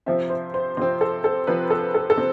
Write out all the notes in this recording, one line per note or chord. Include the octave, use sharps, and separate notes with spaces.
C3 F3 C4 E5
C5
C5
C3 F3 C4 C5
A4
A4
C3 F3 C4 B4
A4
A4
A4
C3 C4